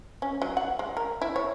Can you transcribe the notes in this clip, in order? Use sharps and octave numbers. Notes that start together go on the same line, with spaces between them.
C#4
F#3
F#5
G#3
A#4
E4
C#5